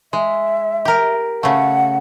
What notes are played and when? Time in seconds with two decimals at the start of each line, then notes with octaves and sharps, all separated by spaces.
0.13 G#3 E5
0.85 G4 A#4
1.43 C#3 A3 F#5